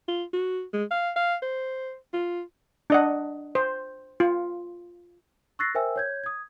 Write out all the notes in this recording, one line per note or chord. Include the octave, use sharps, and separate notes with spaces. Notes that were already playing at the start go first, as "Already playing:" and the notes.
F4
F#4
G#3
F5
F5
C5
F4
D4 D#5 F#5
C5
F4
C#6 E6 F#6 A6 A#6 C7
A#4 C5 E5 G5 G#5 E6
C#5 G6 G#6
D#6 G#6